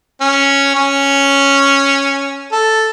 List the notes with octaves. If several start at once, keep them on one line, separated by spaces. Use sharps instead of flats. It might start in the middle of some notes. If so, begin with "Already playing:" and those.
C#4
C#4
A4